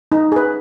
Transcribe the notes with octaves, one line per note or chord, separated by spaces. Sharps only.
D#4
G#4 B4